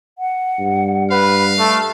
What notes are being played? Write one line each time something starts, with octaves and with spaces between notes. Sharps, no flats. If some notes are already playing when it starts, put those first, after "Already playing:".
F#5
G2
B4 F5
A3 A5